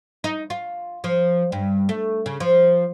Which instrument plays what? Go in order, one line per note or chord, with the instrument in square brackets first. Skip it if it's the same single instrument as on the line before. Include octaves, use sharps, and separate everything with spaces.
[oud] D#4
F4
F3
G2
A3
C#3
F3